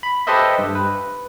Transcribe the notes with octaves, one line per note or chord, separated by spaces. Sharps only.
B5
G4 A4 B4 C5 D#5 E5
G2
B4